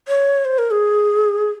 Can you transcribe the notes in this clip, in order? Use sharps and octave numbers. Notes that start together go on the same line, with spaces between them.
C#5
C5
A#4
G#4